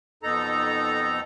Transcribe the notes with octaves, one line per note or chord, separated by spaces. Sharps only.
F2 B2 D#4 A4 A#5